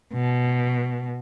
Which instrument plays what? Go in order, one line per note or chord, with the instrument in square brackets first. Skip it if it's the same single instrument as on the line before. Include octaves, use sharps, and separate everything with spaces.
[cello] B2